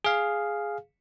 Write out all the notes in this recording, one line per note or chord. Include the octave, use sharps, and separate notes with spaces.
G#4 F5